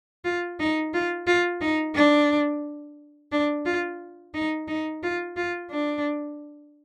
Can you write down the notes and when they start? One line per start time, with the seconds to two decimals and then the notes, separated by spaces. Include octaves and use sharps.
0.25 F4
0.60 D#4
0.94 F4
1.27 F4
1.61 D#4
1.95 D4
3.32 D4
3.66 F4
4.34 D#4
4.68 D#4
5.03 F4
5.37 F4
5.71 D4